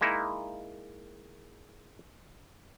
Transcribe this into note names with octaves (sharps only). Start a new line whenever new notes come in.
G#3 A#3 D#4 E4